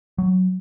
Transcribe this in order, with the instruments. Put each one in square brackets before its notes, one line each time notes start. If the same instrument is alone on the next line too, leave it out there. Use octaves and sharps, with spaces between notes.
[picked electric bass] F#3